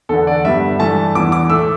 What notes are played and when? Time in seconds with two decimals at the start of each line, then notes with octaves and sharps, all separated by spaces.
0.09 E2 D3 B3 A4
0.27 D5
0.44 G2 D3 G3 B3 E5
0.79 G2 E3 A3 A5
1.14 E2 E3 B3 D6
1.32 D6
1.50 A2 A3 E6